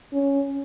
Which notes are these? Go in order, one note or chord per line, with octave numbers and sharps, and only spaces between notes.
C#4